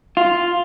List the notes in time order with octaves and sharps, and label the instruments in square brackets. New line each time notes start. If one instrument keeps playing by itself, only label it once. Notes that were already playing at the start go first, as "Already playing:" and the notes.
[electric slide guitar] F4